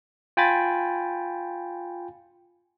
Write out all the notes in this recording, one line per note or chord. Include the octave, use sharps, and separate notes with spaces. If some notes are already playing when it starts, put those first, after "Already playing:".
F4 G5 G#5 B5 A6